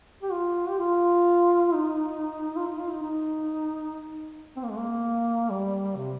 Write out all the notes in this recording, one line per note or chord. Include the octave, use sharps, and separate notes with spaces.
G4
F4
G4
F4
D#4
F4
D#4
F4
D#4
D#4
C4
A#3
G#3
A#3
G3
C3